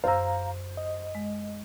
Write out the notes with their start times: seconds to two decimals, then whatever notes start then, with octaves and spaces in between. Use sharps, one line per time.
0.04 F#2 C5 F5 A#5 E6
0.77 D#5
1.15 G#3